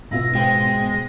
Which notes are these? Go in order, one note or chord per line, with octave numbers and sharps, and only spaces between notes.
G#2 B2 B3 E4 F4 E5 A#6
G#3 B4 C5 G5